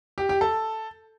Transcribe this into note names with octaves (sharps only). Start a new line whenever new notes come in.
G4
G4
A4